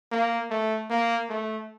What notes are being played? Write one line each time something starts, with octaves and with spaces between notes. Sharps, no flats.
A#3
A3
A#3
A3